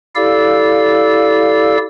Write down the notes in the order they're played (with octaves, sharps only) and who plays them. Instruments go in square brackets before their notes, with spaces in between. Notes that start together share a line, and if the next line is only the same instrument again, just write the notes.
[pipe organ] E4 G4 A4 D5 F5 E6